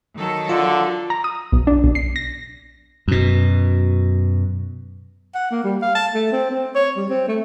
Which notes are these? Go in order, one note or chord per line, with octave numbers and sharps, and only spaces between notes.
D#3 F#3 A4
D3 F4
A#5
D#6
B1
D4
B1
C7
A#6
F#2 B2
F#5
A#3
G3
F5
A5
A3
C4
C4
C#5
G3
C4
A3